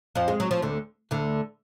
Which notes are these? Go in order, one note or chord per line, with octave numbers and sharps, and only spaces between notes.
F2 F3
G#3
F#3
F3
D2 D3
D2 D3